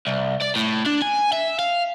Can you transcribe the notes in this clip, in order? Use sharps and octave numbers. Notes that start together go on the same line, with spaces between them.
C2
D5
A2
D4
G#5
E5
F5